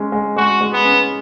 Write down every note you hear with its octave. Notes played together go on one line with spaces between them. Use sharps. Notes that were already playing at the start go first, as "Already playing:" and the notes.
Already playing: G#3 C#4
G#3
G#3 F#4
G#3
B3
C#4